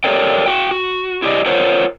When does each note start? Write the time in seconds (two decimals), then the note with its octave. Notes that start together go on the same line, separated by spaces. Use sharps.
0.04 G4 A4 A#4 C#5 D5 G5
0.46 F#4 G5
0.71 F#4
1.22 E4 G4 D5 D#5
1.46 F4 A#4 C5 C#5 F#5